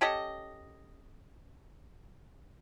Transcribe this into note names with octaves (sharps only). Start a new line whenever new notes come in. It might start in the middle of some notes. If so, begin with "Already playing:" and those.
C#4 G4 A4 D#5